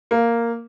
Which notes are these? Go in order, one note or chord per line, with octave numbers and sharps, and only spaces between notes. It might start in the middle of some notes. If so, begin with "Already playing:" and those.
A#3